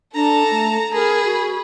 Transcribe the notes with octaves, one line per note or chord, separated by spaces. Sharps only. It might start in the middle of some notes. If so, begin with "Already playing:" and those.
D4 A4 A5 A#5
A3
G#4 A#4 B5
F#4